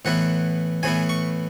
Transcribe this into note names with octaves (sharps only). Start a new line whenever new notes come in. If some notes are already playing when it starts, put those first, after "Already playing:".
A2 E3 B3 E4 F#5
A2 E3 B3 E4 G#5
C#6